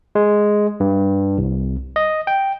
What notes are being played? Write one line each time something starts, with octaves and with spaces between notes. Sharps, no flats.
G#3
G2
C2
D#5
G5